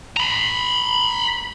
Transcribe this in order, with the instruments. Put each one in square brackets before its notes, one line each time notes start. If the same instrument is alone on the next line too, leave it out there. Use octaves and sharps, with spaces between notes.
[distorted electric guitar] A#5 B5